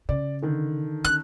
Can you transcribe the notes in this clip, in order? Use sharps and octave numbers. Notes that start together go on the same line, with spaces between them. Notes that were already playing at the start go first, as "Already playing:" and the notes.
C#3 D5
D3 D#3
C#4 F#6